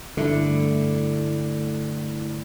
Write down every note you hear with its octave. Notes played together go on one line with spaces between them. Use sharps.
G2 D3 A3 E4